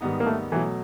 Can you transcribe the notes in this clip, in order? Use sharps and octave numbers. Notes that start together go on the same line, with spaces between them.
G#2 D#3 G3 B3 D#4
A#3
A3
B2 E3 F#3 A3